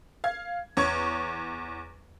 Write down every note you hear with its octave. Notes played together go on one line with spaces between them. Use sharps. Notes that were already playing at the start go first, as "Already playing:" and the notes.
F5 G#6
E2 C#5 C#6 G#6